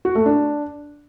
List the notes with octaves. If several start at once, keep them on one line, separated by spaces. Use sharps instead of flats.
F#4
A3
D4